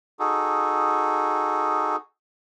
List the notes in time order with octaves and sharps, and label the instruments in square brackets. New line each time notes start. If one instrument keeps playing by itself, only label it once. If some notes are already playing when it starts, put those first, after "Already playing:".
[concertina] D#4 F#4 G#4 A4